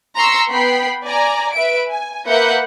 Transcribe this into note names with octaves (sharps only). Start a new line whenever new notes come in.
A#5 C6 C#6 E6
B3 G5 B5 C7
D5 G#5 A#5
B4 E5 D7
G#5
A#3 A#4 B4 E5 F#5 G6